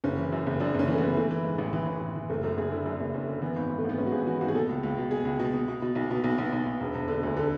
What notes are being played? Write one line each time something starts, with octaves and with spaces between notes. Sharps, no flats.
F#1 C#4
E3
F#2
F#1
F#2 D4
F#1 C#4
E3
A3
B3
F#1
E3 A3
E3
G#2
A1
E3
A1
E3
E3
F#1 A3
F#2 A3
F#1 G#4
D3 E4
F#2 D4
F#1
F#1 C#4
D3
E3 B3
G#1
G#1
A3
G#1 B3
G#2 C#4
F#4
G#1 G#4
E3 F#4
G#1 F#4
G#4
B2 A4
C#2
C#2
B2
B2 G#4
C#2
B2
B2
B2
B2
B1
B2
B1
B1
B1
B1
E1
E1
D3
D2
D3 A4